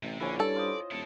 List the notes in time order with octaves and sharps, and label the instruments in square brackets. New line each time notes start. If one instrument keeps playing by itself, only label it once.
[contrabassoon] A1 [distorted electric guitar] C3
[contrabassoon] A#1 [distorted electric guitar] D3 [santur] C#4 E4
[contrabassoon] G2 [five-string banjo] A4 [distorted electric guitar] D5
[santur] F4 C5 D#5
[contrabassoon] D#1 [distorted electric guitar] E4 A4